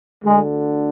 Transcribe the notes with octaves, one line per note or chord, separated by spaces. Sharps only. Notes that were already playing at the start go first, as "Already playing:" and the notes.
D2 D3 G#3